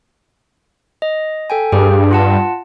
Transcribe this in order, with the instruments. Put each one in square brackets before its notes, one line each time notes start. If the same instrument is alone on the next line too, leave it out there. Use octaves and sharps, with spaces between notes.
[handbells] D#5
A4 G5 G#5
[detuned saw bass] G2 [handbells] G4 G#4 G5
[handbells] F4 F#5 A5